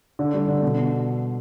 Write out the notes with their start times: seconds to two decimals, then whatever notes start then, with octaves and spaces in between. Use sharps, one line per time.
0.19 D3
0.34 G3
0.48 D3
0.62 B2